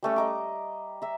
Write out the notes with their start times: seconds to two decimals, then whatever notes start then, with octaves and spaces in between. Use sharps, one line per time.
0.03 G3 A3 C#4
0.16 D#5 A#5 D6
1.02 E5 A#5